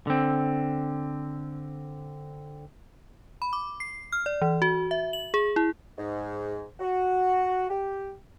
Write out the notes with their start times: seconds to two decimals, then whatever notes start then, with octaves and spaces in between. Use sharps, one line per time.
0.07 D3 C4
3.42 B5
3.53 D6
3.80 C7
4.12 F6
4.26 D5
4.42 E3
4.62 F#4
4.91 E5
5.13 F#7
5.34 G#4
5.56 E4
5.98 G#2
6.80 F#4
7.70 G4